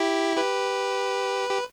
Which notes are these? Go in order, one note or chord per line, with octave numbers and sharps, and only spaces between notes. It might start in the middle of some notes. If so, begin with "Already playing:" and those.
Already playing: E4 G4
G4 B4
G4